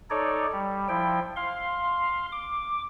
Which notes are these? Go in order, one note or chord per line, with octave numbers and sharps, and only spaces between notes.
D#4 A4 C#5 D5
G3
F3 E4 G5
F5 C6
D6